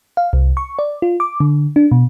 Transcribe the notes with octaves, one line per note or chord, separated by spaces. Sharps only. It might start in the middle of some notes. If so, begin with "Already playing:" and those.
F5
C2
C#6
D5
F4
D6
D3
D4
B2